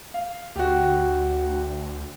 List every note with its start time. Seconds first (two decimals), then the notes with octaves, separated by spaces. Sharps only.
0.14 F5
0.56 D2 F#4 G4